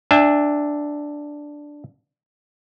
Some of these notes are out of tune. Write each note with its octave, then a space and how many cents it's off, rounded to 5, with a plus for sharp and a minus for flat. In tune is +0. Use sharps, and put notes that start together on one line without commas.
D4 +0 E5 +0 G#5 -45